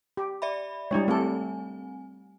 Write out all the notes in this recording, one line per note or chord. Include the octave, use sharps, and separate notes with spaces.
G4
D5 E5 B5
G3 G#3 D4 E4 C#5
A3 C4 G4 A4 G#5